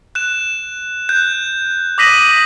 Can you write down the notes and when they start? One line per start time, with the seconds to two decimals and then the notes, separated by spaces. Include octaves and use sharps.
0.15 F#6 E7
1.09 F#6 G6
1.98 D6 D#6 A#6 B6 D#7 F#7